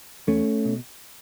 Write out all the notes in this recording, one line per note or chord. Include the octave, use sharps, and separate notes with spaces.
E2 A3 C#4
B2